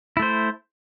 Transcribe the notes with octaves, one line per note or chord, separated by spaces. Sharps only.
A3 E4 C5